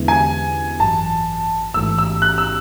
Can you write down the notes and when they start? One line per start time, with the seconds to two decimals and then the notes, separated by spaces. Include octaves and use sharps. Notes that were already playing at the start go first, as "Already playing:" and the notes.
Already playing: E2 D3 G#3 B3 E4
0.08 G#5
0.80 G#1 F#2 E3 A5
1.74 A1 G#2 E3 A3 E6
1.98 E6
2.22 F#6
2.38 E6